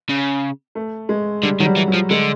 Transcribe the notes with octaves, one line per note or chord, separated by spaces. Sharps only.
C#3
A3
G#3
D3 G3
D#3 F#3
G3
E3
F#3
F3
D3 G#3